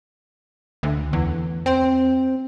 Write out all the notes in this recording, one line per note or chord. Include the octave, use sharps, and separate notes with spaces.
D2
E2
C4